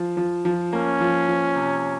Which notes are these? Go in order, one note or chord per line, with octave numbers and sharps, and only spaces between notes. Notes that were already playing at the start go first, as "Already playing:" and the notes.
Already playing: F3
F3
F3
A#3 C#4
F3
F3
C3